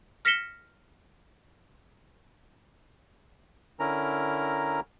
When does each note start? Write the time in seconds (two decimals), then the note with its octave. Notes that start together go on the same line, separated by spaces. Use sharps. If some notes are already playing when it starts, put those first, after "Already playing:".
0.25 F6 A#6 B6 C#7 E7 G7
3.80 D3 C#4 E4 A#4 A#5